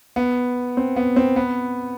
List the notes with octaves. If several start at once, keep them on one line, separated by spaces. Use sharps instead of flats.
B3
C4
B3
C4
B3